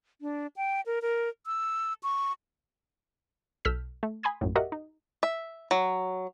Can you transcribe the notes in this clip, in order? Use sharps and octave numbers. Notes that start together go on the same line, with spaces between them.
D4
G5
A#4
A#4
E6
C#6
B1 A4 E6 F6 G6 B6
A3
G#5 B5 C6 D#6 G#6
A#1 F#2 A2
F#4 G4 A#4 D#5 E5 F#5
D#4
E5
F#3